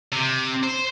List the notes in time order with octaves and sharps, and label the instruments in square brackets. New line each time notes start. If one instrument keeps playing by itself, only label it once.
[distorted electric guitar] C3
C5